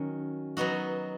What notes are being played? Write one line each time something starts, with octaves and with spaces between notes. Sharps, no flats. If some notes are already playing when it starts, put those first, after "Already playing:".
Already playing: D#3 F#3 C#4
F#3 B3 D#4 F#4